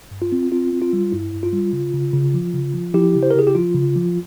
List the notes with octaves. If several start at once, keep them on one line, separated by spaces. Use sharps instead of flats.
G2
F4
C4
C4 F4
C4
F4
G3
G2 E4
G2
F4
G3
C#3
C#3
C#3
F3
C#3
F3
F3 E4 G4
C#3
C5
A#4
C#3 G#4
G4
F3 F4
C#3
F3